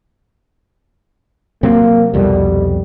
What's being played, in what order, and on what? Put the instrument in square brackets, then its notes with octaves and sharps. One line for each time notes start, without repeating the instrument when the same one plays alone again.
[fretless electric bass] C3 F#3 C4 [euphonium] A#3
[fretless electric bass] C2 F2 B2 [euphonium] G3